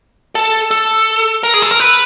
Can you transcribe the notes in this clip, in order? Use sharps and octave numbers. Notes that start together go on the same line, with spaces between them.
A4
A4
A#4
G#4
A4
A#4
B4